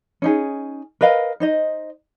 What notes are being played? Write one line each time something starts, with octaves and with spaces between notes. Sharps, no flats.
C#4 D#4 G#4
A#4 B4 D#5 F5
D#4 C5 D#5